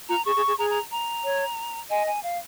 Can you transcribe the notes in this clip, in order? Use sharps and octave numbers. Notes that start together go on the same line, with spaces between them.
F4 A#5
G#4 C#6
G#4
G#4
G#4 A#5
A#5
A#5
C#5
D#5 G#5
G#5
F5